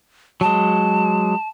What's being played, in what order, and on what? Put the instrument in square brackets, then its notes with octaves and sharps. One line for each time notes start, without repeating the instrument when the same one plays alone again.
[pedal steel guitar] F#3 G#3 [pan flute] A5